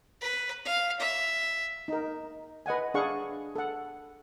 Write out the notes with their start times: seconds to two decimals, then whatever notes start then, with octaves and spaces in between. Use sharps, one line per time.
0.21 B4
0.65 F5
0.99 E5
1.88 D#4 A#4
2.66 B4 D#5 F#5 G#5
2.94 D4 G#4 F5 F#5 C#6
3.55 A4 F#5